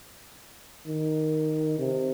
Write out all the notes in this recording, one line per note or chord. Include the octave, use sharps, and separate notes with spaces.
D#3
C3